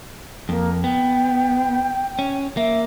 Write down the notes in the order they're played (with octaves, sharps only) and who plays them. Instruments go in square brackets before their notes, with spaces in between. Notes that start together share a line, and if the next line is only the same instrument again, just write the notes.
[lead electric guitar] F2 [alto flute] A#3
[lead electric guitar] B3 [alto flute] G5
[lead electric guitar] C#4
[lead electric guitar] A#3 [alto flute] E5